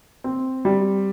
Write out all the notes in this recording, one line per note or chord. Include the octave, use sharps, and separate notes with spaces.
C4
G3